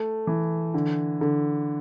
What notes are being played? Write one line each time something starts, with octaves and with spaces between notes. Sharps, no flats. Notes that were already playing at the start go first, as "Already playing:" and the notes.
Already playing: A3
E3
D3
D3